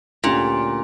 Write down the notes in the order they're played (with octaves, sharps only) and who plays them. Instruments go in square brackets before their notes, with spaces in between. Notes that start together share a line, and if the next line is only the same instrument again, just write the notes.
[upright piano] D2 D3 A3 C#4 G4 [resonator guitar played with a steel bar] A#2